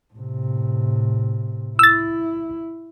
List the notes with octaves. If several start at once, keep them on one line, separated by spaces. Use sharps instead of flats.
A2 C3
E4 E6 A6